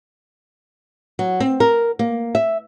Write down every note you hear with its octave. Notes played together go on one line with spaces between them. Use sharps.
F#3
C4
A#4
A#3
E5